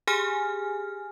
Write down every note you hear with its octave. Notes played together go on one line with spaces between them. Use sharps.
G4 G#4 G#5 F6